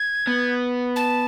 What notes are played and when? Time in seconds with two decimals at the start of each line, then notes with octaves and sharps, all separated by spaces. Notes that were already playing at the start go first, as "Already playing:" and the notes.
Already playing: G#6
0.27 B3
0.96 A5